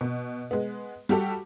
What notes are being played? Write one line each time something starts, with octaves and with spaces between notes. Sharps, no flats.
B2
G#3 B3
G3 F#4 G4 A4